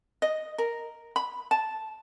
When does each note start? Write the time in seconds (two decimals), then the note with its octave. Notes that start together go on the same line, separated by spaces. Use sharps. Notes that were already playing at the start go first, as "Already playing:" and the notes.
0.22 D#5
0.58 A#4
1.16 B5
1.51 A5